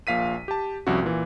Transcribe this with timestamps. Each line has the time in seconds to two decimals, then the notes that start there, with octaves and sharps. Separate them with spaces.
0.07 A#1 A#2 F5 B6 D#7
0.48 G4 A5
0.87 C2 F2 F3 C#4 F#4
1.02 A#2 E3